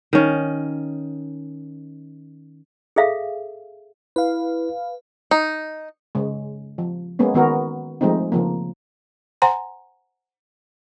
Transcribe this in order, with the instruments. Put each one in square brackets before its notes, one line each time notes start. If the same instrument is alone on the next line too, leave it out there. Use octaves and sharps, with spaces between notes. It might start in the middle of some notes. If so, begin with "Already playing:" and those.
[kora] D#3 C#4
[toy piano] G#4 A4 E5 F5
[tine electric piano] E4 [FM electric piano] B4 F5
[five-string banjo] D#4
[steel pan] C#3 G#3
F3
G#3 A#3 B3 C#4
D#3 B3 F#4 A#4
F3 G#3 A3 C4 D#4
C#3 F3 A#3
[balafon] C5 F#5 G#5 A#5 C6